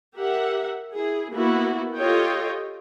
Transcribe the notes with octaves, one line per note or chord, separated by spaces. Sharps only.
G4 A#4 E5 F#5
E4 G#4
A#3 B3 E4 F#4
F4 G4 A4 C#5 D#5 G5